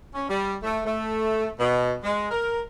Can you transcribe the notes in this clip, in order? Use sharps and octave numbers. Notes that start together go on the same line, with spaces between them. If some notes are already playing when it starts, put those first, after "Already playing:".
C#4
G3
A3
A3
B2
G#3
A#4